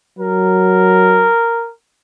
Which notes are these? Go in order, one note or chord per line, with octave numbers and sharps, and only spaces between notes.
F#3 A#4